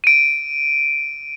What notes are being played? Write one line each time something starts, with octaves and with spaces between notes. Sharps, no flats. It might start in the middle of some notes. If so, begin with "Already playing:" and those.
D7 D#7